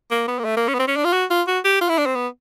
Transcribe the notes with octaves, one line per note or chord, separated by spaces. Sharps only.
A#3
B3
A#3
A3
A#3
C#4
B3
C4
C#4
D4
F4
F#4
F4
F#4
G4
F4
E4
D4
C4
B3